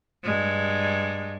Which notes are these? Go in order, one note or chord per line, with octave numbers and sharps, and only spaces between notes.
G2 G#3